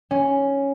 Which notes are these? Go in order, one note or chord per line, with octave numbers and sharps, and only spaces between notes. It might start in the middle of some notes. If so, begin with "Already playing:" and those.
C#4